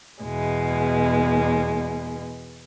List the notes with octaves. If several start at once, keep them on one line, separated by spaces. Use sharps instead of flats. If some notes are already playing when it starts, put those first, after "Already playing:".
E2 B2 G#3